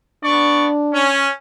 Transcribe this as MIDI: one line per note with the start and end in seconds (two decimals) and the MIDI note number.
0.24 0.67 59
0.24 1.09 62
0.24 0.67 74
0.24 0.67 85
0.94 1.29 61